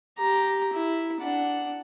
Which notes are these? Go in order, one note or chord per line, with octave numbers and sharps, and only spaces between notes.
G4 A#5
E4
D4 F#5